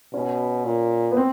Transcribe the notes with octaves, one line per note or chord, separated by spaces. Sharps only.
B2 C#4
A#2
B3
C4